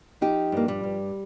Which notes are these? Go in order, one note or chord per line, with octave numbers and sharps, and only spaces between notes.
F3 D#4 G4
G2 A#3
G3
G2